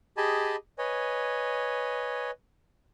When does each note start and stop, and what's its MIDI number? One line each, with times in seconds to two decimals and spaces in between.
0.17 0.56 67
0.17 0.56 68
0.17 0.56 75
0.17 0.56 80
0.17 0.56 81
0.17 0.56 83
0.78 2.31 71
0.78 2.31 73
0.78 2.31 75
0.78 2.31 80